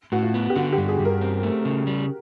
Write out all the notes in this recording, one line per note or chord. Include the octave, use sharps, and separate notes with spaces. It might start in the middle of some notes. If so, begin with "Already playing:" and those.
A2 F#4
F4
B3
G4
D3 F#4
G4
G2
G#4
G2
A#4
C4
A3
C#3
G3